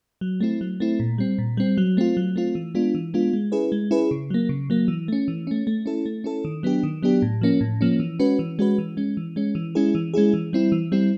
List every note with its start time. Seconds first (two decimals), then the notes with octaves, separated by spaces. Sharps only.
0.21 F#3
0.40 A3 C4 E4
0.61 F#3
0.80 A3 C4 E4
1.00 A#2
1.18 G3 C4
1.38 A#2
1.57 G3 C4
1.77 F#3
1.97 A3 C4 F4
2.17 F#3
2.36 A3 C4 F4
2.55 E3
2.75 G#3 B3 D4 F4
2.95 E3
3.14 G#3 B3 D4 F4
3.33 G#3
3.52 C#4 E4 G#4 B4
3.72 G#3
3.91 C#4 E4 G#4 B4
4.11 C#3
4.30 F#3 A#3
4.49 C#3
4.70 F#3 A#3
4.88 E3
5.08 A3 C#4
5.28 E3
5.47 A3 C#4
5.67 A3
5.86 C#4 E4 A4
6.06 A3
6.24 C#4 E4 A4
6.45 D#3
6.63 F#3 B3 D4 G4
6.83 D#3
7.02 F#3 B3 D4 G4
7.22 A2
7.41 F3 A#3 C#4
7.61 A2
7.81 F3 A#3 C#4
8.00 E3
8.19 G#3 C#4 F#4 B4
8.39 E3
8.59 G#3 C#4 F#4 B4
8.78 E3
8.97 G#3 C#4
9.17 E3
9.36 G#3 C#4
9.55 E3
9.75 G#3 C#4 E4 G#4
9.95 E3
10.14 G#3 C#4 E4 G#4
10.34 E3
10.53 G3 C4 E4
10.72 E3
10.92 G3 C4 E4